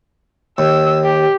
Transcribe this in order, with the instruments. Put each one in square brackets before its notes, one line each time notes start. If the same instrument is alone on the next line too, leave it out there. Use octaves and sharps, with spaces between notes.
[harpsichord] D#2 [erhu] E6
[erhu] G4